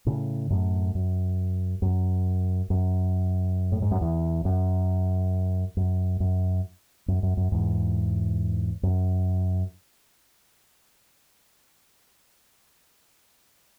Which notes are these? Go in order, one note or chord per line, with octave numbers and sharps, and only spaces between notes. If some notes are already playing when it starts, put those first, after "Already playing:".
A2 C#3
F#2 A2
F#2
F#2
F#2
A2
G#2
F#2
E2
F#2
F#2
F#2
F#2
F#2
F#2
E2 G#2
F#2